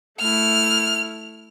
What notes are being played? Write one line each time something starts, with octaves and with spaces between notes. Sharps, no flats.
A3 E4 F6